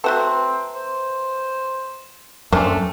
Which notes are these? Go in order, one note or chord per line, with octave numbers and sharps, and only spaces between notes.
A3 C4 F#4 A4 B4 E5 A#5
C5
F#2 A3 A#3 C4 D4 G#5 D6